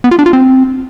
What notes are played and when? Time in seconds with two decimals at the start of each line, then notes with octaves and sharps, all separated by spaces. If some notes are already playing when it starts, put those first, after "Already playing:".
0.04 B3
0.11 F4
0.19 D4
0.26 F4
0.33 C4